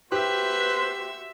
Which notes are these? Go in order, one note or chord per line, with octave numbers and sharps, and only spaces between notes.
F#4 G4 B4 C5 E5